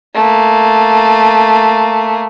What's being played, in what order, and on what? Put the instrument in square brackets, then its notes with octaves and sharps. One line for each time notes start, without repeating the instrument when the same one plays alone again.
[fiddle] A3 A#3